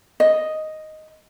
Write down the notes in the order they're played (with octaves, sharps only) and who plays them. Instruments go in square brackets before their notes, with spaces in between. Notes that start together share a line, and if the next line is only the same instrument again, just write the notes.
[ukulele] D#5